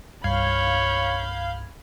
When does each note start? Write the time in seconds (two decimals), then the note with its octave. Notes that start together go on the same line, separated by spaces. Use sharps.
0.24 C2 G2 C#5 F5 B5 G6 G#6